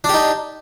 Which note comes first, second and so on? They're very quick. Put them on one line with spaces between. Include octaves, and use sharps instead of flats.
D4 G4 D#4